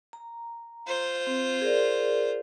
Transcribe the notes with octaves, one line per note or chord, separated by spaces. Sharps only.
A#5
F4 C5
C4
G#4 A#4 D5